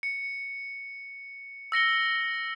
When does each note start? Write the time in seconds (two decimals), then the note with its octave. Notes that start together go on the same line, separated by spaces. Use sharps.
0.03 C#7
1.72 E6 A#6 C#7 G7